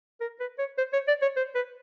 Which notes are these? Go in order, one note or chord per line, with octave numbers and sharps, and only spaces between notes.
A#4
B4
C#5
C5
C#5
D5
C#5
C5
B4